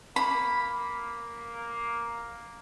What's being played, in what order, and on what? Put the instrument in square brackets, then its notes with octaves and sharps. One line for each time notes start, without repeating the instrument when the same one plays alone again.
[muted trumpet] A#3 [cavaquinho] B5